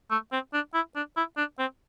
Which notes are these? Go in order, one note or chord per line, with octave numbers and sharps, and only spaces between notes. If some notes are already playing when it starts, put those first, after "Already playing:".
A3
C4
D4
E4
D4
E4
D4
C4